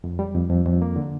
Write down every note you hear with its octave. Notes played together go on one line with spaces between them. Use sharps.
F2
G3
F2
F2
F2
A#3
D3